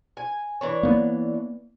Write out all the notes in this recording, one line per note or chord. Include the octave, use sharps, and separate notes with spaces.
G#5
E3 D4 C#5
A#3 B3